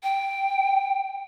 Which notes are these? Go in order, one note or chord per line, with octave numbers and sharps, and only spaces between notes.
G5